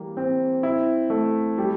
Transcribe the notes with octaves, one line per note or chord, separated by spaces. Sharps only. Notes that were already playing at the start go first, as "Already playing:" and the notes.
Already playing: E3 G3 A#3
C4
E4
A3
G3